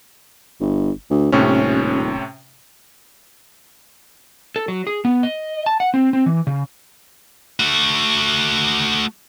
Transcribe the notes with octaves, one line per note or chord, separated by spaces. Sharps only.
G1
D2
D#1 A2 C3 C#4
A4
F#3
G#4
B3
D#5
A5
F#5
C4
C4
E3
C#3
A3 F#4